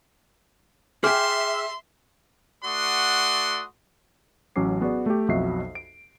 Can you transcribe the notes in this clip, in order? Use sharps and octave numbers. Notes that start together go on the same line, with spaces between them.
G#4 E5 G5 C6 D6 F6
A3 F#4 D5 F#5 C6 D#6
A1 F#3 C#4 D6 C7
B3 F#4 G#4 D5
A3 G4
B1 F2 F#4 D#5 E5 C7
D7